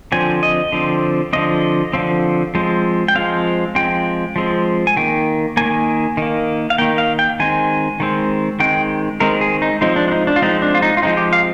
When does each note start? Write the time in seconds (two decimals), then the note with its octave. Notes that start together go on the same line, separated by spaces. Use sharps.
0.12 D3 F3 C4 G#5
0.43 D#5
0.72 D3 F3 C4
1.33 D3 F3 C4 D#5
1.93 D3 F3 C4
2.55 F3 G#3 C4
3.08 G5
3.15 F3 G#3 C4 F5
3.75 F3 G#3 C4 G5
4.36 F3 G#3 C4
4.87 G#5
4.97 D#3 A#3 G5
5.57 D#3 A#3 G#5
6.17 D#3 A#3
6.70 F5
6.78 D#3 A#3 G5
6.98 F5
7.19 G5
7.40 D#3 G#3 C4 G#5
8.00 D#3 G#3 C4
8.60 D#3 G#3 C4 G5
9.20 D#3 G#3 C4 A#4
9.41 G#4
9.62 D#4
9.81 F3 G#3 C4 D#4
9.96 D4
10.08 D4
10.12 D#4
10.27 D4
10.36 F4
10.42 F3 G#3 C4 D#4
10.62 D4
10.74 F4
10.82 D#4
10.97 F4
11.02 F3 G#3 C4 D#4
11.17 G4
11.33 F5